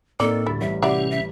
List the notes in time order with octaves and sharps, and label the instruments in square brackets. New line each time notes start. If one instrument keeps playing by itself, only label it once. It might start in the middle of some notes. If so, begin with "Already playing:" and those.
[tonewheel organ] A2 [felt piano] A#3 C4 D#4 [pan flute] A4 [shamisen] D5
[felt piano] D2 G3 [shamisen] E4
[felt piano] A1 G3 [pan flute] E5
[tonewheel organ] C3 C#4 [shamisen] E4 F#4 D5 [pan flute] G4
[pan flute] E5